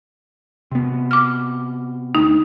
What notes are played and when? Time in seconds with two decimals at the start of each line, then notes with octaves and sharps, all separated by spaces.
0.72 C3 B3
1.11 D6 F6
2.15 D2 D#4